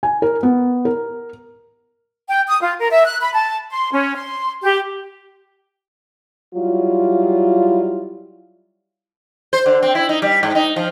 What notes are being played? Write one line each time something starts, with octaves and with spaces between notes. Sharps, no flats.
G#5
A#4
B3
A#4
G5
D#6
F4
A#4
E5
F#6
B5
A5
C6
C#4
C6
G4
F#3 G3 E4 F4
C5
D3
C4
E4
D#4
G3
G#2
D#4
F3